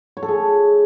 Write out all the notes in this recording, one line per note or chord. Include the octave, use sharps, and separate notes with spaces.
C#5
A4
G#4